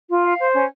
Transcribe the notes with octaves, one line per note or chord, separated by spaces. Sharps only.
F4
F5
C5
C#4